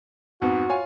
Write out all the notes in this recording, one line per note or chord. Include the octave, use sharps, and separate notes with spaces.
F2 G#2 B3 F#4
F4 C#5 G#5